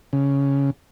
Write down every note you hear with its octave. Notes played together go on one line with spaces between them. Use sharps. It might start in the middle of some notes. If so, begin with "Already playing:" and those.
C#3